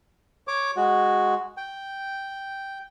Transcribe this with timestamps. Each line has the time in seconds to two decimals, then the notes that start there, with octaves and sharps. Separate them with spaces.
0.48 C#5 D6
0.77 G#3 F#4
1.57 G5